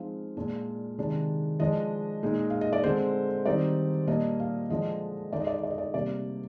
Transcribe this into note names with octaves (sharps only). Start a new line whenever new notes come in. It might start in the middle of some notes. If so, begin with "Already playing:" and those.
Already playing: F3 G#3 C4 D#4 F5
A#2 G#3 D4
C3 D#3 G#3 D4
F3 G#3 D4 D#5
A#2 G#3 D#4
F5
D#5
D5
D3 G#3 C4 C5
D#3 G3 C4 D#4 D5
A#2 G3 A#3 D4 D#5
F5
D3 F3 G#3 D4 D#5
D3 G#3 D#4 D5
D#5
D5
D#5
D5
D#5
D5
C3 G3 A#3 D5